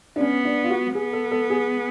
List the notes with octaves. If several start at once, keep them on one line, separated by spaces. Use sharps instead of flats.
D4
B3 C#4
D4
F4
F#4
B3 G#4
A4
A4
G#4